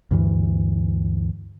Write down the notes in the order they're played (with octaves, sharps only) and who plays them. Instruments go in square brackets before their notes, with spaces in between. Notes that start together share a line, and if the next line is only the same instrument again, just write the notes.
[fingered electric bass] D2 G2 E3